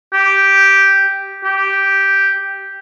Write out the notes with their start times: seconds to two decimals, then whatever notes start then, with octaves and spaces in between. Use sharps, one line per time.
0.13 G4
1.45 G4